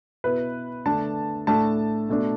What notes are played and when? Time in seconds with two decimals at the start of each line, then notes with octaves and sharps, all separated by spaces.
0.24 B2 B3 E4 B4
0.85 D3 A3 D4 A5
1.47 A2 A3 D4 A5
2.09 B2 A3 D4